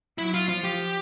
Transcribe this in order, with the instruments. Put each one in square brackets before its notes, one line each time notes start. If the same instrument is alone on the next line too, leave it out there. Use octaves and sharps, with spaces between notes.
[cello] F#3 [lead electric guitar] E4
[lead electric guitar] F4
[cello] F3 [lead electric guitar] F4
[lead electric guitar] G4